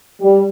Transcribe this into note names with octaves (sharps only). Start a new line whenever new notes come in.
G3